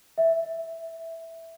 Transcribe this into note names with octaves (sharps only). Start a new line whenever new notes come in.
E5